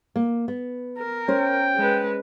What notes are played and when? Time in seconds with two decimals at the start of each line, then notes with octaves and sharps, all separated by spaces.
0.16 A#3
0.48 B3
0.98 A#4
1.28 C#4 C5 G5
1.76 G#3 B4